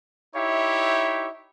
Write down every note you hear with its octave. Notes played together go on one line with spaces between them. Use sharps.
D#4 E4 G4 C#5 E5